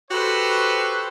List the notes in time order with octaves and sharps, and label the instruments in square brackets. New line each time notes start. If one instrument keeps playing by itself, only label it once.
[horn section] F#4 G4 A4 B4 C5